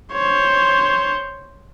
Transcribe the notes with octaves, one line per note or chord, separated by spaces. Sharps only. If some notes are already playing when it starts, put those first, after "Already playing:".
C5 C#5